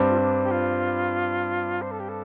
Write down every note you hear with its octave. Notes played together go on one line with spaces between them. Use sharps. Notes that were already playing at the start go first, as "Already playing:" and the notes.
Already playing: G2 G3 C4
F4
D4
G4
F4
C5
A4
G4
A4